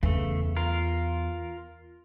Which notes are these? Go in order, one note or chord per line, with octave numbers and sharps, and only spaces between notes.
E2 C#3 A3
F4 A#4